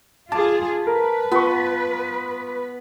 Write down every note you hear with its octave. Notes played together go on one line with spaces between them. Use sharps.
F4 G#4 A5 D6
A#4 B4
B3 F4 C#6